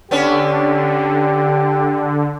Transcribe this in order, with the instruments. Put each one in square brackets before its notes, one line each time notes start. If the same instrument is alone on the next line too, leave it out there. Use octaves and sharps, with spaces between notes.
[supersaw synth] D3 [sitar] B3 C#4 D4 [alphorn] G4